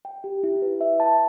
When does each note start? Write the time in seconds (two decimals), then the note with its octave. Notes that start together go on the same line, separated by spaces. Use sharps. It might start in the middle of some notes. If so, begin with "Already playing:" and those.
0.05 G5
0.24 G4
0.43 E4
0.62 B4
0.81 E5
1.00 A5